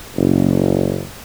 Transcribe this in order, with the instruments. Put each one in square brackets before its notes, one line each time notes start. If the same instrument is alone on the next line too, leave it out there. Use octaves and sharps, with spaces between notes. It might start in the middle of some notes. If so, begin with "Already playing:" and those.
[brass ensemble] F#1